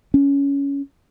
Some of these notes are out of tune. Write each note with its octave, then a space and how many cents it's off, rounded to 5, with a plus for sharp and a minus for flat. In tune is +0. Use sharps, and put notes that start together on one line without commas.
C#4 +15